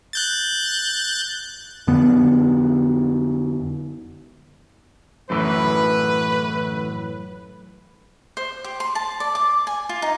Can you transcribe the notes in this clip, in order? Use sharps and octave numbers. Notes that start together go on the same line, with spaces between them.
F#6 G6 A6
F2 D3 B3
F#2 A2 E3 B4
C5
G4
C6
A5
D5
D6
G#5
F4
D#4